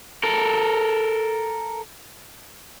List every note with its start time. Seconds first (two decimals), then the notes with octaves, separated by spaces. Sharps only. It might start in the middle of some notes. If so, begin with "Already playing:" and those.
0.23 A4 A#4